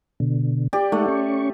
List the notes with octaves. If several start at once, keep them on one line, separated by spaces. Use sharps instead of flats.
B2 D3
G4 D5
G#3 A3 D#4 F#5
C#4 C#6